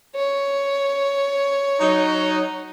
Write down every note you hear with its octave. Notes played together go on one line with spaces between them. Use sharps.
C#5
F#3 D#4